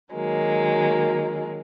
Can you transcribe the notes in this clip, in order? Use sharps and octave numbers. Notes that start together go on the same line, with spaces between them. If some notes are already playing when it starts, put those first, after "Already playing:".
D#3 F#3 G#3 A#3